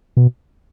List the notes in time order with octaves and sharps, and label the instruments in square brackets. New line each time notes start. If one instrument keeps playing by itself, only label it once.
[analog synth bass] B2